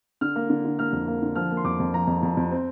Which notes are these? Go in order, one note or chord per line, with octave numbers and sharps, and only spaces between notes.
D3 F6
A#3
D3
D3
A#3 F6
F2
A#3
D3
F3 F6
A#3
C6
F2 D6
F2
F3 A#5
F2
F2
F2
C4